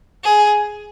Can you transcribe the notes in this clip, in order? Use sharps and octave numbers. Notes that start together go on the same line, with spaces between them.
G#4